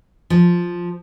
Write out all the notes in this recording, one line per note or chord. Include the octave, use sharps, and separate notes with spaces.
F3